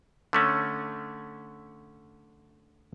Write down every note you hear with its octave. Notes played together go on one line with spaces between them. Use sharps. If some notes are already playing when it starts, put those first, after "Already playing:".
D3 A3 C#4